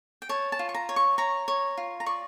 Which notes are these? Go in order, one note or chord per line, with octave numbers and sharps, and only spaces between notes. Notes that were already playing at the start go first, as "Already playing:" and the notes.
G5
C#5 A5
A5
F4
C#6
A#5
C#5
C#6
C#5 A#5
C#5
F4
A#5
D5 C#6